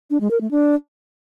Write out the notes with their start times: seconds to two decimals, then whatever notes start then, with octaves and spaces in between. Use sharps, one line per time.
0.10 D4
0.21 G#3
0.31 A#4
0.41 A3
0.51 D4